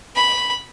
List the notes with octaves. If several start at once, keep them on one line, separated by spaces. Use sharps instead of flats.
B5